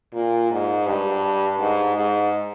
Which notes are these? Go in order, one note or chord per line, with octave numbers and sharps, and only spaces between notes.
A#2
G#2
G2
G#2
G#2